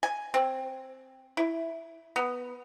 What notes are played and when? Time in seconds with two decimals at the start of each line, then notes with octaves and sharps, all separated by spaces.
0.03 G#5
0.34 C4
1.37 E4
2.16 B3